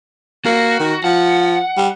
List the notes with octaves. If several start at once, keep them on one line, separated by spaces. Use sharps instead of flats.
A#3 F#4
D#3
F3 F#5
G3